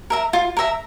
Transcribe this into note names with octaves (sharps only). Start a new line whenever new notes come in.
A#4 E5 A#5
F4
A#4 E5 A#5